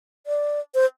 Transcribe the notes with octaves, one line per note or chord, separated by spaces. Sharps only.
D5
C5